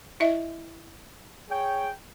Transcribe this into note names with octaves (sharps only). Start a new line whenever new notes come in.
E4 D#5 E5
G#4 C#5 G5